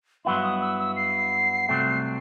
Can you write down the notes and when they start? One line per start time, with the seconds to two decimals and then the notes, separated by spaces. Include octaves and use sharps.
0.25 G2 F#3 B3 E4 C6
0.43 D#6
0.62 E6
0.79 E6
0.96 C7
1.69 C2 C3 F#3 A3 C4